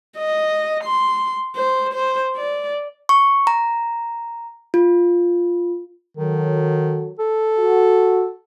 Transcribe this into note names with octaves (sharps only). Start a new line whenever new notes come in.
D#5
C6
C5
C5
D5
C#6
A#5
F4
D#3 F#3 A4
A4
F#4